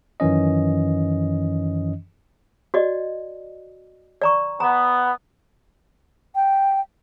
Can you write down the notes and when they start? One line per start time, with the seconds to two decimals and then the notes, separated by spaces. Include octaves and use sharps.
0.20 F#2 D#3 E3 C#4 D#5
2.74 F#4 D5 D#5
4.22 D5 A#5 C#6
4.60 B3 A#5
6.35 G5